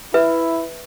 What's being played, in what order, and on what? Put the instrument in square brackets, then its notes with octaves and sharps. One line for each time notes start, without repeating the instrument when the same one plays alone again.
[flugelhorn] E4 [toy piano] B4 E5